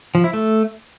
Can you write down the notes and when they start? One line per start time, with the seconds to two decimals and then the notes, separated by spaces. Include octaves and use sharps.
0.15 F3
0.24 E4
0.33 A3